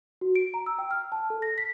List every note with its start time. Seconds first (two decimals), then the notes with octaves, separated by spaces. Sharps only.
0.21 F#4
0.36 D7
0.54 A#5
0.66 E6
0.79 G5
0.91 F6
1.12 A5
1.30 A4
1.42 A#6
1.58 B6